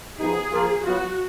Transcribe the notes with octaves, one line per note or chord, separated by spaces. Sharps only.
F3 B3 D#4 G#4
F3 A#3 F4 A#4
F#3 B3 F4 F#4